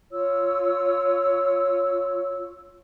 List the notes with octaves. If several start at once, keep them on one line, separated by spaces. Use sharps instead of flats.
F4 C#5 E6